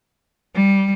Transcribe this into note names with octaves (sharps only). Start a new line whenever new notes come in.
G3